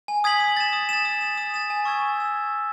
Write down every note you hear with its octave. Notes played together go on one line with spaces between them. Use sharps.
G#5
D#6 G#6 B6 F#7
D#6
A6 E7
D#6
A6 E7
D#6
A6 E7
D#6
A6 E7
G#5
C#6 E6 G#6
G#5
E6 G#6